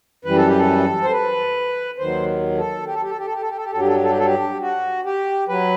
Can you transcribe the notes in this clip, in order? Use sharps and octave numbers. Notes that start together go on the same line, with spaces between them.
F#2 E3 G3 B4
A4
G4
A4
C5
B4
D#2 D#3 F#3 C5
A4
G4
A4
G4
A4
G4
A4
G4
A4
G4
A4
G4
G2 F#3 A4
G4
A4
G4
A4
G4
A4
G4
F#4
G4
F#3 B4